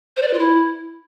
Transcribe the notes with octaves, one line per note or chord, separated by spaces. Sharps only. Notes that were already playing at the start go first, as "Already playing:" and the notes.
C5
D5
B4
F4
E4